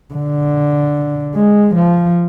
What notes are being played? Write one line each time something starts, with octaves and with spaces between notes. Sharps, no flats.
D3
G#3
F3